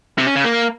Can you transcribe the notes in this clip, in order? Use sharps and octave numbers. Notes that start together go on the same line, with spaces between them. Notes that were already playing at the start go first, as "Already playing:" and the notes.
C3
C#4
C#3
A#3